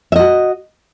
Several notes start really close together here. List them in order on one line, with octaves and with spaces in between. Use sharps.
E5 D#5 F#4